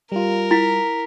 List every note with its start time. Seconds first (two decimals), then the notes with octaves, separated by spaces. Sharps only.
0.12 G3 F4 A#4
0.51 E4 A#5 B6